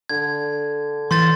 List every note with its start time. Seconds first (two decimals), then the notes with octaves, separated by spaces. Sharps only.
0.09 D3 G#6
1.11 E3 C6 G6 A6